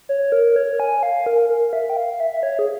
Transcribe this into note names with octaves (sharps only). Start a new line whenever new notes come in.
C#5
A#4
C#5
G#5
F5
A#4
A#4
E5
G5
F5
E5
E5
C#5
G#4